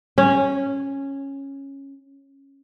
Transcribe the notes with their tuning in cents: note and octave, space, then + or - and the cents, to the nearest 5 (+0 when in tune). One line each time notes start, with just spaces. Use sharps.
C#4 -10